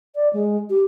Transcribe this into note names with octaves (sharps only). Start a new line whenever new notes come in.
D5
G#3
G4